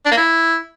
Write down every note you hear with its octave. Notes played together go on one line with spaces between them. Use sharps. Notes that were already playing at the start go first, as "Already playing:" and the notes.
D4
A#3
E4